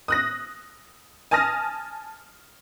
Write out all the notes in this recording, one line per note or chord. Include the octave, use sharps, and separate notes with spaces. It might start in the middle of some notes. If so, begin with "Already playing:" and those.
D#6 F#6 A#6
G#5 A5 D#6 F6 A#6